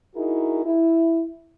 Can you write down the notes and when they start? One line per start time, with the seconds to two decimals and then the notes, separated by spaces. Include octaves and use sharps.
0.15 D#4 E4 F#4 G#4 A#4
0.65 E4